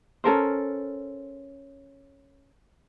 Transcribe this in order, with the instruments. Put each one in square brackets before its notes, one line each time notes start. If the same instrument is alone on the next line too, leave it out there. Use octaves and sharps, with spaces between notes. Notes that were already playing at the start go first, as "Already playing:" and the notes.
[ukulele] C#4 A4 A#4 C5